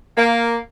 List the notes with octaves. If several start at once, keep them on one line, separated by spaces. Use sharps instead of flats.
A#3